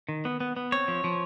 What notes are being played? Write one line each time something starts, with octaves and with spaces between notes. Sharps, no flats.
D#3
B3
B3
B3
C4 C#5
F3
F3